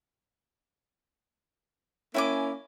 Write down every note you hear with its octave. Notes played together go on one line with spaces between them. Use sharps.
A#3 C#4 E4 G#5 D6